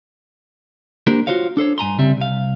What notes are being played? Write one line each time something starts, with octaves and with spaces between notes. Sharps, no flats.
A#3 D4 G4 A#4 C5
F4 F#4 C5 C#5 F5
D4 A4 C5 C#5
G2 G#5 A#5 C6
C2 C#3 G3 C4 E5
C2 F5